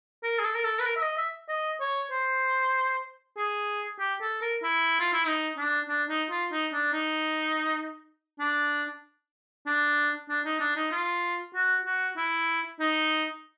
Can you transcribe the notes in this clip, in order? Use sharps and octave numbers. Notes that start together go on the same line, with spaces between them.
A#4
G#4
A4
A#4
A4
B4
A#4
E5
D#5
E5
D#5
C#5
C5
G#4
G4
A4
A#4
E4
F4
E4
D#4
D4
D4
D#4
F4
D#4
D4
D#4
D4
D4
D4
D#4
D4
D#4
F4
F#4
F#4
E4
D#4